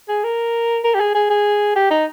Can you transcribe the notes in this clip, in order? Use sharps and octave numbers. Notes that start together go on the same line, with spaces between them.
G#4
A#4
A#4
G4
G#4
G#4
G#4
G4
D#4